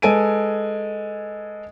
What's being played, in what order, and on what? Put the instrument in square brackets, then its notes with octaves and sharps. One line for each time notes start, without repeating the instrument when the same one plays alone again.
[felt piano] G#3 A4 B4 G#5 D7 D#7